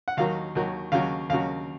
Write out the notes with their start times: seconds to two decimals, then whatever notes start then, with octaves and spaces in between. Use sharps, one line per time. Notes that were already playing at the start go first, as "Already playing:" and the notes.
0.08 F#5
0.17 D#2 D#3 F#3 F5
0.55 D#2 D#3 F#3
0.92 D#2 C#3 F#3 F5
1.30 D#2 C#3 F#3 F5